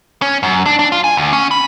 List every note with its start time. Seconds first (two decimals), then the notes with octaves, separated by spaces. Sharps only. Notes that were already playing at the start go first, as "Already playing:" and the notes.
0.22 C#4
0.43 F#2
0.66 D4
0.79 D4
0.92 F4
1.04 G#5
1.17 D2
1.33 C#4
1.51 B5